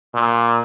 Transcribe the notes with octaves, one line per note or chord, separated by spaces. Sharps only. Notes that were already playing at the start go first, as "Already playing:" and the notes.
A#2